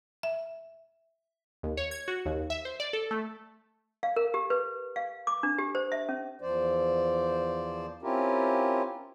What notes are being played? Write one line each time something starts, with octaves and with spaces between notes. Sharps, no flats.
E5
D#2
C#5
G#6
F#4
D#2
E5
C5
D5
A4
A3
F5
A#4
G4
B4
F5
D6
D4
G4
C5
E5
C#4
E2 F3 C5 D5
C4 C#4 E4 F4 G4 A#4